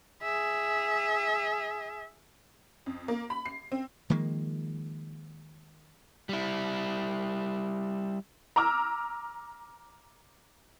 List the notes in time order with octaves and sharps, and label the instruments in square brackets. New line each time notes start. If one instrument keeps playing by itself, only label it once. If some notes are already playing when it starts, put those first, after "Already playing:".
[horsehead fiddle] G#4 E5
[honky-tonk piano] F2
A#3
B5
C7
C4
[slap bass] D#3 F3 G#3 A#3
[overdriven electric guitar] G3 E4
[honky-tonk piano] A#5 D6 E6 F6